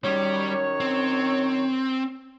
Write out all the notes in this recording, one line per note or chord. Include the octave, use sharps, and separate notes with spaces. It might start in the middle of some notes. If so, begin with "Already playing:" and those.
F#2 D#3 G3 C#5
C4